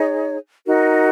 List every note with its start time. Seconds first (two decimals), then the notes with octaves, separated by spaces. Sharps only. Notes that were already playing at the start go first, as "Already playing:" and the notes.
Already playing: D#4 G#4 C#5
0.65 D#4 F#4 A#4